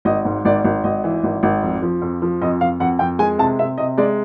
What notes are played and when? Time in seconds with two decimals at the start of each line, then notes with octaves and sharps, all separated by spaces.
0.05 G#1 D#5
0.25 G#2
0.45 G#1 D5
0.64 G#1
0.84 G#1 D#5
1.04 E3
1.24 G#1
1.43 G#1
1.63 F2
1.82 F3
2.02 F2
2.22 F3
2.42 F2 D#5
2.61 F2 F5
2.80 F2 F#5
2.99 F2 G5
3.19 G#3 G#5
3.38 C3 A5
3.59 C3 E5
3.78 C3 D#5
3.98 G#3 D5